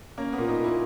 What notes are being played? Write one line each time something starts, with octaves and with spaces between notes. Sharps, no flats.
A#3 C#4
B3
A#2
D#4
A#2 E4